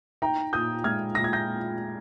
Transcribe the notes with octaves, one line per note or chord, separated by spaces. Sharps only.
D#4 G5 A#5
A#2 D#6 G6
G#3 F6 G#6
A#2 A#6
G#6
G6 A#6